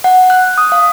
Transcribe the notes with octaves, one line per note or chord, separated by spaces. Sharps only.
F#5
F#6
D#6
F5